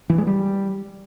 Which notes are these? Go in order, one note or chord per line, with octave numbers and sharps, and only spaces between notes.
E3
G#3
G3